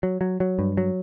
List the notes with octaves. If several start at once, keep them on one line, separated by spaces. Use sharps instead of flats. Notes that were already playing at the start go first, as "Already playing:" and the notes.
F#3
F#3
F#3
G2
F#3